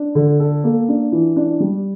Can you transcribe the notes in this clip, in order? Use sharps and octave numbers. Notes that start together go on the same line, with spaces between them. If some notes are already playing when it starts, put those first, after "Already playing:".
Already playing: D4
D3
A4
A#3
D4
E3
D4
G3